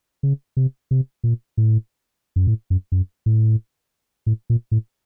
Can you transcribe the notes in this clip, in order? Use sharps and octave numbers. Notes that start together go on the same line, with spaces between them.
C#3
C3
C3
A#2
A2
F#2
A2
F#2
F#2
A2
A2
A#2
A2